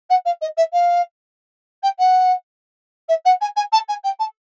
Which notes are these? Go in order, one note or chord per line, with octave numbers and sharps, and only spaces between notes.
F#5
F5
D#5
E5
F5
G5
F#5
E5
F#5
G#5
G#5
A5
G#5
G5
A5